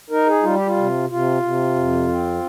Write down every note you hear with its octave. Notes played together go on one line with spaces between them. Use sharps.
D#4 A#4
G#4
G3 F4
G4
F4
C3
C3 F4
C3
F2
C4